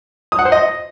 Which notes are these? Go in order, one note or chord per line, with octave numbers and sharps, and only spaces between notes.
D#6
F#5
C5
D#5